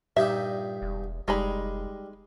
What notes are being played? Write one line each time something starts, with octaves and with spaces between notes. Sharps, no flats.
G2 A#2 D#4 G4 E5
E1
F1 G3 G#3 D#4 B5